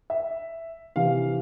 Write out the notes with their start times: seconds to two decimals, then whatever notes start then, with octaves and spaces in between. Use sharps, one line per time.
0.10 E5
0.96 C3 E3 F5